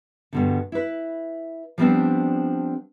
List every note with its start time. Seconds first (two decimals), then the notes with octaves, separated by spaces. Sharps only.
0.33 G2 B2 D3
0.72 E4 B4
1.78 F3 G3 G#3 B3 C4 D4